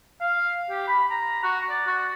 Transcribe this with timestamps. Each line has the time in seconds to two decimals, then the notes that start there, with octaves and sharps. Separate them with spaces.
0.21 F5
0.70 G4
0.87 B5
1.11 A#5
1.43 F#4
1.69 D5
1.87 F#4